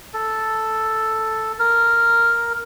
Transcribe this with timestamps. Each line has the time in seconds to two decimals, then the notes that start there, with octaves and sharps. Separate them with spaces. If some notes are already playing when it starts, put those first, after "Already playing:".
0.14 A4
1.59 A#4